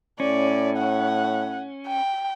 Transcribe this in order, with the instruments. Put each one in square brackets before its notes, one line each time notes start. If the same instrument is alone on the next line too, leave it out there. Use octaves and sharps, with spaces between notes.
[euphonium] A2 [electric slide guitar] C#4 [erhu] D5
[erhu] F#5
G5